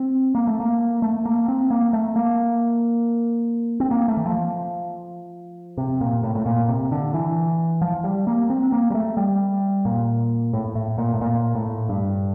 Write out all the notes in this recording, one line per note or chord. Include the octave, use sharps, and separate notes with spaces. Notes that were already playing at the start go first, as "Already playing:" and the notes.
Already playing: C4
A#3
A3
A#3
A3
A#3
C4
A#3
A3
A#3
C4
A#3
A3
E3
F3
C3
A#2
A2
A2
A#2
C3
D3
E3
F3
G3
A#3
C4
A#3
G3
A3
G3
A#2
A2
A2
A#2
A2
A#2
A2
G2